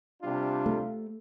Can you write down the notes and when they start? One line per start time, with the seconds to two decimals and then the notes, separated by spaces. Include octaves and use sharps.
0.21 C3 G3 D4 F4
0.66 A3